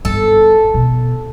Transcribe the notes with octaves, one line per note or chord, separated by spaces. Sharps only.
G1 A4
B2